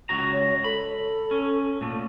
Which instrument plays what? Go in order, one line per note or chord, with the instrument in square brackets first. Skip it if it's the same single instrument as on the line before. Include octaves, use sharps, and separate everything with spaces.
[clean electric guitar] C#2 F#4 A#5
[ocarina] C#5
[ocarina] A4 [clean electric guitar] B5
[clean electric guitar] C#4
A#2 A3